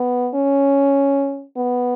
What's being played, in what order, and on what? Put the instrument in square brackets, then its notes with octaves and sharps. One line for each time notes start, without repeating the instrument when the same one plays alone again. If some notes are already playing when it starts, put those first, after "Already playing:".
Already playing: [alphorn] B3
C#4
B3